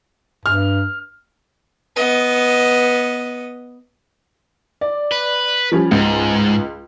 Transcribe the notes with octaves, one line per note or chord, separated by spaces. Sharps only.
G2 F6
B3 D#5
D5
B4
F3 G3 C#4
C#2 G#2